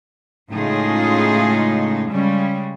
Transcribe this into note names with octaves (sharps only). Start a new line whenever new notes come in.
A2 C#3 G#3 D#4 F4 G#4
C#3 G3 G#3 C#4